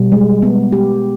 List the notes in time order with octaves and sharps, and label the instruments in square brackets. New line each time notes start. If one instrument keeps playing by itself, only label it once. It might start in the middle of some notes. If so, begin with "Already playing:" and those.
Already playing: [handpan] B2 [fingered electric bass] G3
[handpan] G#3
B3
G4